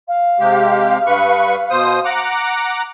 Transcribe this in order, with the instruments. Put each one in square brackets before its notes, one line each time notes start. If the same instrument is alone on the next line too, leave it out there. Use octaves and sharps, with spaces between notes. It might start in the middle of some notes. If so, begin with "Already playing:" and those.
[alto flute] F5
[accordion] C3 G#3 G4
G2 B4 C#6
B2 C5 D#6
F#5 A#5 D6